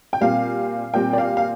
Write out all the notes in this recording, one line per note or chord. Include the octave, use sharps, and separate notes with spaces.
G5
A#2 G3 C4 F5
A#2 G3 C4 G5
D5
F5
F5